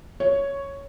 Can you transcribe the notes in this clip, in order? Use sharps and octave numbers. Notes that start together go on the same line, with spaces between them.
C#5